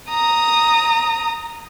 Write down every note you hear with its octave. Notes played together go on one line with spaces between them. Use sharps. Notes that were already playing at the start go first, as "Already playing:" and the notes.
A#5 D#6